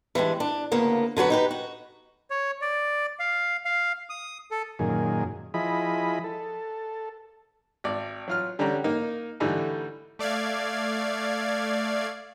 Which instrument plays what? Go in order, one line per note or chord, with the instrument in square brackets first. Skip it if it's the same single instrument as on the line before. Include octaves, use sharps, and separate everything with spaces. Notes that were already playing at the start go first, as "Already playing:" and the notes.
[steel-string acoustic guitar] E3 G3 G#3 D4
D4
D2 C#3 A#3 B3
D3 F#3 F#4 B4
D#4 G4 B4
F#4
[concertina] C#5
D5
F5
F5
D#6
A4
[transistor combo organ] F#2 A#2 D#3 G#4
F3 E4 G#4 D#5 B5
A4
[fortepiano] G#1 D5
F#3 F4 F6
D3 G3 C#4 G4 A#5
A#3 D#4
D3 E3 G3 A3 D#4
[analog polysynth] A3 D5 F5 G#6